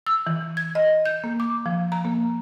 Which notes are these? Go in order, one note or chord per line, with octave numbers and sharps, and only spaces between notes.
E6
E3
G#6
D#5
G6
A#3
D6
F3
A#5
A#3